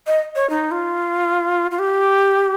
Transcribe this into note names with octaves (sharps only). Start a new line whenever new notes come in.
D#5
C#5
D#4
F4
F4
G4